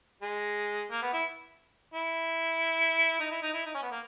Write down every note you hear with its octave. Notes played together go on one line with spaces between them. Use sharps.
G#3
A#3
B3
E4
E4
D#4
E4
D#4
E4
D#4
C#4
B3
A#3